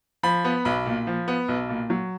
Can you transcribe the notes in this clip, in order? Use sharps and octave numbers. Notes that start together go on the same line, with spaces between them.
F3 B5
B3
B1 B5
A#2
F3
B3
B1
A#2
F#3